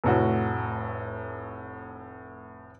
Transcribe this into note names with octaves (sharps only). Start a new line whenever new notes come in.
F1 A2 F#4